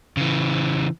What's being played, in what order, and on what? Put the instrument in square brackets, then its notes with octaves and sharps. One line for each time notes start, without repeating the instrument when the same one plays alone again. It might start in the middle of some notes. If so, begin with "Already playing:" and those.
[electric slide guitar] C#3 E3